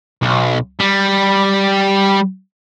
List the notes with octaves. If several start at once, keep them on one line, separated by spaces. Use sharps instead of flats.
B1
G3